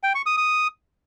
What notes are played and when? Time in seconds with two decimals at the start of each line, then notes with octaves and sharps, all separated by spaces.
0.04 G5
0.15 C#6
0.26 D#6
0.37 D#6